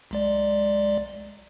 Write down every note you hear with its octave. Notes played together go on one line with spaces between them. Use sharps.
B1 G#3 D5